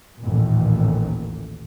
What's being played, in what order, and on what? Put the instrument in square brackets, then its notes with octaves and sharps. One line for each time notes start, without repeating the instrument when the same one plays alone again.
[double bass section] A1 D#2 A#2